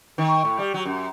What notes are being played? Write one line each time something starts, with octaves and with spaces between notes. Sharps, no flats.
D#3
A2
G3
F#3
F#2